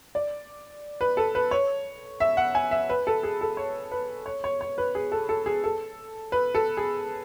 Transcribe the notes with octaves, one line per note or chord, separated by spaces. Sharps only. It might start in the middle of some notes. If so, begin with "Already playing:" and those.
D5
B4
A4
B4
C#5
E5
F#5
G#5
E5
B4
A4
G#4
A4
C#5
B4
C#5
C#5
C#5
B4
G#4
A4
A4
G#4
A4
B4
A4
G#4